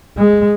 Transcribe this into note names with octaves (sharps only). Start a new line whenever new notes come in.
G#3